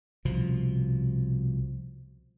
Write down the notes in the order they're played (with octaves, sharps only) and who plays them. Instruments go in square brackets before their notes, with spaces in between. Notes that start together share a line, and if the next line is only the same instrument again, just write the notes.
[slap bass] C2 B2 F3